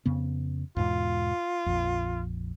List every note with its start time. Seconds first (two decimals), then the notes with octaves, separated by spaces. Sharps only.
0.06 F2 C#3 B3
0.76 E2 G#2 B2 F4
1.66 A#1 F2